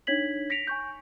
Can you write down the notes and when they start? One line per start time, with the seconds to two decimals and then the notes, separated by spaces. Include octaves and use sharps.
0.07 D4 D#4 C#5 G#6 B6 F#7
0.50 A#6 B6 C#7 D7 F7
0.67 G#5 C#6 G6